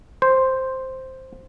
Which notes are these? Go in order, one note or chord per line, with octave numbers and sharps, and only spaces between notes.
C5